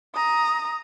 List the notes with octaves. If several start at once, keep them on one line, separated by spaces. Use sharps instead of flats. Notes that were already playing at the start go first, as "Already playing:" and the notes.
A#5 D#6